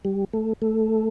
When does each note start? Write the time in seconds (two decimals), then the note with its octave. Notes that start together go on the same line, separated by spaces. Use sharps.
0.05 G3
0.33 A3
0.62 A3